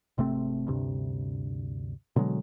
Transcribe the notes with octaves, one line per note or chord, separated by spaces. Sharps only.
G#1 C3 A3 C4
D2 G2 C3
B2 D3 F#3 G#3